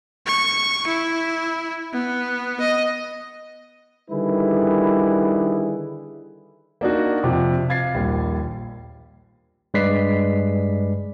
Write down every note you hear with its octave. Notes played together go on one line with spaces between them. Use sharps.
C#6
E4
B3
D#5
D3 D#3 G3 E4 G#4 B4
A#3 D4 D#4 F#4
F2 C3 F3
F5 G#6 A6 C7
A#1 D#2 G3
G2 G#3 B4 D5 B6 C7